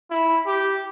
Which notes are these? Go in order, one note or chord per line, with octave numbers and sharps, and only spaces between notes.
E4
G4